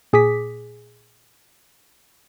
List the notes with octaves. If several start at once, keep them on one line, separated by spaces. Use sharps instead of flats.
A#2 G#4 D6 D#6 B6